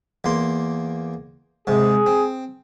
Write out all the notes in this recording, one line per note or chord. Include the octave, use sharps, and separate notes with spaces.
E2 A#3 C6
G#2 C3 G#4
C4